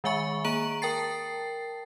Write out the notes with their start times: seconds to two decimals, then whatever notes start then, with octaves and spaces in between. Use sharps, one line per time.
0.04 D#3 G#3 E5 G#5 C#6
0.45 A#3 G#4 A#5 D7 F#7
0.82 A#4 G5 A5 A6 C7